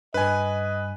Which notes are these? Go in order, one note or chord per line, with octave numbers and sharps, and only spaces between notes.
G2 B4 D#5 G#5